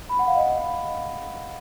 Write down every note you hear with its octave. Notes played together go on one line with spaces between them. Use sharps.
B5
F#5
F5
D#5